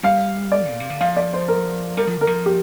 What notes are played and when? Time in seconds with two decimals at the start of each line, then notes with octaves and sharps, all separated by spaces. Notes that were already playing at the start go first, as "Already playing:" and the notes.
0.03 G3 F5
0.52 D5
0.70 A#2
0.80 C3
0.90 D3
1.01 F3 F5
1.17 D5
1.33 C5
1.48 A#4
1.97 G3 A#4
2.07 F3
2.17 D3 A#4
2.27 F3
2.46 G4